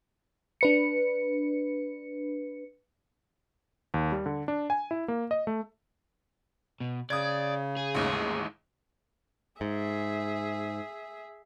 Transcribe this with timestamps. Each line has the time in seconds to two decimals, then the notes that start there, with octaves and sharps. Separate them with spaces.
0.61 D4 B4 C#7
3.94 D#2
4.12 G3
4.26 D3
4.48 D4
4.70 G#5
4.91 E4
5.08 A#3
5.31 D#5
5.47 A3
6.80 B2
7.10 C#3 D5 D#6 G#6
7.77 G#4
7.94 A1 D#2 G#2
9.61 G#2 G#4 E5